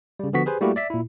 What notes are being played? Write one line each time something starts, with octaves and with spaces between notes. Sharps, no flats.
C#3 G3
D3 F3 B3 F#4 B6
G4 G#4 B4 C5 G#5
G3 A3 A#3 E4 F#4 G4
D5 E5 B6
A#2 E4